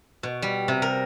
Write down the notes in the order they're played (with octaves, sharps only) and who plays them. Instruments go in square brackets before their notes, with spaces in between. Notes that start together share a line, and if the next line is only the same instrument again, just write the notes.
[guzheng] B2
G3
C3
A#4